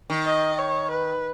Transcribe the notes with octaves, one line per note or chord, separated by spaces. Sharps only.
D#3
D#5
C#5
B4